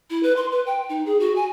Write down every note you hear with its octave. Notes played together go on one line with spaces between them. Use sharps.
E4
B4
C6
B4
G5
D#4
G#4
F#4
G#5